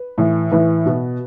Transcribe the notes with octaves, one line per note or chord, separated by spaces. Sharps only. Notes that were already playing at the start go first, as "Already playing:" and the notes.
Already playing: B4
A2 E3
A2 E3 B4
B2